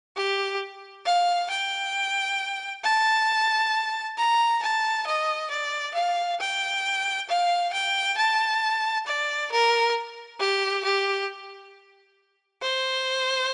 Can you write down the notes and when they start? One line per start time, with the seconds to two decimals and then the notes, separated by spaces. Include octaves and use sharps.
0.17 G4
1.06 F5
1.50 G5
2.84 A5
4.18 A#5
4.62 A5
5.07 D#5
5.50 D5
5.95 F5
6.40 G5
7.29 F5
7.73 G5
8.17 A5
9.06 D5
9.52 A#4
10.40 G4
10.85 G4
12.62 C5